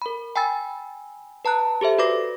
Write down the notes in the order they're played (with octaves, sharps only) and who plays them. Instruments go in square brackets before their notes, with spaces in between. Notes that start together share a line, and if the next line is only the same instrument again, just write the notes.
[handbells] A#4 B5
G5 G#5 B5 E6 A6
B4 A5 A#5 F#6
G4 A4 C5 E5
F#4 B4 D5 D6 A#6